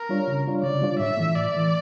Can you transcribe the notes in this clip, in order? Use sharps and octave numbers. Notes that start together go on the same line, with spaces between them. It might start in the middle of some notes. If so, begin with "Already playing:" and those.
Already playing: A#4
G3 D4 F4 C#5
C#3
G3 D4 F4 C#5
C#3 D5
G3 D4 F4 C#5
A2 E5
E3 A3
A2 D5
E3 A3